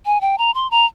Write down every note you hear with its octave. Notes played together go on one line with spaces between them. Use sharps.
G#5
G5
A#5
C6
A#5